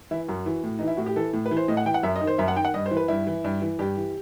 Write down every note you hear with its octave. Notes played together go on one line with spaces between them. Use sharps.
E3 E4
F#2 F#4
E3
A2
E3 D#4
E4
A2 F#4
G4
E3 A4
A2
B4
E3
C5
A2 D#5
F#5
E3 G5
F#5
F#2 E5
D#5
D#3
C5
F#2 E5
F#5
D#3 G5
F#5
G2 D#5
C5
E3
B4
G2 E4
E3
G2
E3
G2 G4
E3